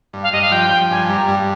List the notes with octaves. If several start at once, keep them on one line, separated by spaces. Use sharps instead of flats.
G2
F5
G2 D#5
F5
F3 G5
F3
G2 G#5
G3 A#5
G2